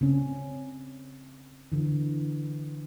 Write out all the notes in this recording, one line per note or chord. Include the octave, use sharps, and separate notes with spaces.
C#3 C4 C#4
D3 E3